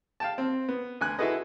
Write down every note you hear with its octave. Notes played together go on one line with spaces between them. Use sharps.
F5 G5 A5
C4
B3
D2 G#5 F#6
E4 F#4 G#4 A4 B4 D#5